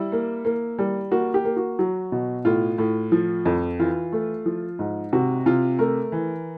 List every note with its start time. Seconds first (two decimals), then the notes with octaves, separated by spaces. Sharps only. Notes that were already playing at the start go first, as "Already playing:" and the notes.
Already playing: G3 E4
0.12 A#3
0.45 A#3
0.79 G3
1.12 A#3 F#4
1.34 G4
1.45 A#3
1.57 F#4
1.79 F#3
2.12 B2
2.45 A2 F4
2.78 A2
3.12 F3
3.45 F2
3.79 E3 F4
4.12 A3
4.46 F3
4.79 G#2
5.13 C3 F#4
5.46 C3 F4
5.79 A3 A#4
6.12 E3